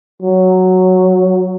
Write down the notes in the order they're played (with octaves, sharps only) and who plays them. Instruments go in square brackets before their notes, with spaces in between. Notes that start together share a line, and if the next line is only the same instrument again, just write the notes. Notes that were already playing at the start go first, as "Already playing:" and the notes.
[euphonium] F#3